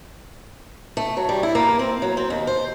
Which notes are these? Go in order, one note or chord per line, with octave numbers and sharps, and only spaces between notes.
A3
F#3
G3
E4
A#3
C4
F#3
C4
D#2
C5